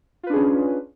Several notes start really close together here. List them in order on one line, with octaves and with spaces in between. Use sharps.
F4 B4 D4 G#4 C#4